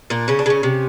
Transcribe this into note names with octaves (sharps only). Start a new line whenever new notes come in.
A#2 D4
C#3 C#4
D4
C#3 C#4
C3